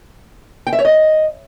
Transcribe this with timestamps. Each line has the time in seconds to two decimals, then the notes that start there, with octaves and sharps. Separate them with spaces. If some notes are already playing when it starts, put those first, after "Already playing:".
0.67 G5
0.73 E5
0.79 C#5
0.85 D#5